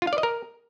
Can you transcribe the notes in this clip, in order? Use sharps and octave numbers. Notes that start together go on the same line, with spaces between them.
F4
F5
D5
D#5
A#4